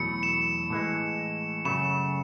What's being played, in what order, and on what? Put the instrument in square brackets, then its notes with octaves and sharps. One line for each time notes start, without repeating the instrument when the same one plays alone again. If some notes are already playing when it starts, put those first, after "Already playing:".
Already playing: [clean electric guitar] E2 B2 F#3 A3 E4 [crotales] C#7
[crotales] E7
[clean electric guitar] A2 E3 G#3
[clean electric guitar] F#2 C#3 F#3 A3 C#4 [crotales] E7